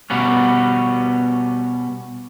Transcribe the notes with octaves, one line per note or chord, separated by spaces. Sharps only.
B2 G3 B3 C#4